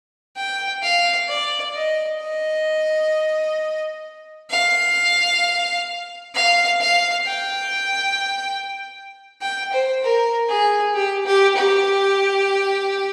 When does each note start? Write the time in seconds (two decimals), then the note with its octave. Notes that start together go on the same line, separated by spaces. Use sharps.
0.36 G5
0.83 F5
1.28 D5
1.74 D#5
2.20 D#5
4.51 F5
6.35 F5
6.81 F5
7.27 G5
9.41 G5
9.72 C5
10.03 A#4
10.49 G#4
10.94 G4
11.26 G4
11.56 G4